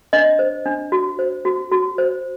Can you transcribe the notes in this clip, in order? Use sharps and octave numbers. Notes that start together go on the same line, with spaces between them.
D4 D#5
C5
D4
F#4
C5
F#4
F#4
C5